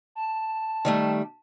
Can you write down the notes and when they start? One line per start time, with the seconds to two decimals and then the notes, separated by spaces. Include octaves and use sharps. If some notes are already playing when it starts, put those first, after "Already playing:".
0.15 A5
0.85 D#3 G3 A3